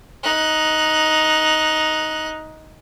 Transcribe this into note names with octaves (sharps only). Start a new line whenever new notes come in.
D#4 F#6